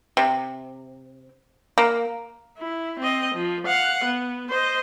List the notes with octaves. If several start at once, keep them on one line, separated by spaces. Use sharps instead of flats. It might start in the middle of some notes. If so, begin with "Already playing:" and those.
C3
A#3
E4
C4 D#5
F3
F5 F#5
B3
C5 D#5